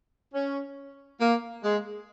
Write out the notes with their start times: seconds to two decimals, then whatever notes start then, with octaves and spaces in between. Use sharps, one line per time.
0.33 C#4
1.21 A#3
1.63 G#3